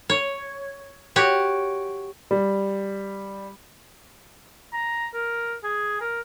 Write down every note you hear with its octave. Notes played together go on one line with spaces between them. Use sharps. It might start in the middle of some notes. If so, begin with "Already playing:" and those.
C#5
F#4 G4 C#5
G3
A#5
A#4
G#4
A#4